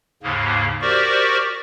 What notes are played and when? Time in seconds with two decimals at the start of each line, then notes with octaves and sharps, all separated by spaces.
0.23 D#2 G#2 C#3 A#3
0.81 F#4 G4 A#4 C5 D5 C#6